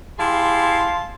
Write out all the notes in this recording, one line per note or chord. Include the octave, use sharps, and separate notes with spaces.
E4 G4 G#4 F5 A5 C6